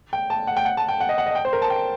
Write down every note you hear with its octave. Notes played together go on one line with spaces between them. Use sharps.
G5
A5
F#5
G5
F#5
A5
G5
F#5
D#5
F#5
D#5
G5
C5
A#4
A5
G5